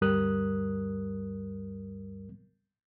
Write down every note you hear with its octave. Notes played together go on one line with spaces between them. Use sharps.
D2 G2 G3 A#4 D#6 F#6